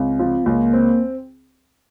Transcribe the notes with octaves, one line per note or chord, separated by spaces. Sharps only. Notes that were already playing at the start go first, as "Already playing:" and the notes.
Already playing: C#2 C4
F3
C#2 A#3
C4